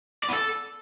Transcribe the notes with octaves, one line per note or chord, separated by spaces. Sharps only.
D5
B3
A4